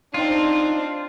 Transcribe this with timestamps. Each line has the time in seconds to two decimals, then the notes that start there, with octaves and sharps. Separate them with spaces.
0.14 C4 D4 D#4 F4